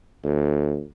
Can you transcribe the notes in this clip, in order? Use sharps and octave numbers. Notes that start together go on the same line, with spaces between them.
D2